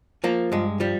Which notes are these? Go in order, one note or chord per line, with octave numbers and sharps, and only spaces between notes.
F3 A#3
G2 G#3
F3 G3